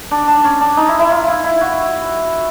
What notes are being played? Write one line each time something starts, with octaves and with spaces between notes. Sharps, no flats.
D4
D4
C#4
D4
D#4
E4
E4
F4
E4
E4
F#4